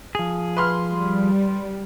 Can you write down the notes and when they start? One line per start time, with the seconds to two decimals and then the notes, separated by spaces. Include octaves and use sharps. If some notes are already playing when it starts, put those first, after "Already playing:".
0.15 F3 G#4
0.56 B4 C6 F6
0.90 G3